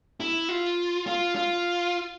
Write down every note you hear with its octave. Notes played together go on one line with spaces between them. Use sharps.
E4
F4
F4
F4